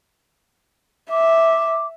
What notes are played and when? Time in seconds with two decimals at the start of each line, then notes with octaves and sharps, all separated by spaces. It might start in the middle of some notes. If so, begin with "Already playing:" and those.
1.11 E5 D6